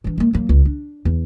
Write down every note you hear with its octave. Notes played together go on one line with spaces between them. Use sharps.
E3 D4
G#3 A#3
F#3 A#3
C#2
D4
E2